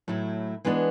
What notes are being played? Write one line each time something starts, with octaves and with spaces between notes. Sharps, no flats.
A2 F#3 A3 E4
E3 G#3 B3 D4